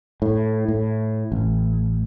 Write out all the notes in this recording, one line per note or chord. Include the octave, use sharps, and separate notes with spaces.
A2
A2
A1